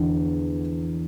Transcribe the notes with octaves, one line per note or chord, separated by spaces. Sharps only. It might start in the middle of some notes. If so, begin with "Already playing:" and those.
Already playing: E2 D3